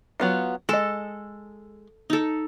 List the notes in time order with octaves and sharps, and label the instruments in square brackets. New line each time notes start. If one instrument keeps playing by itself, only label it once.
[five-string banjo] F#3 B3 F4
[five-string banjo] G#3 D#5 [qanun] A4
[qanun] D#4 A4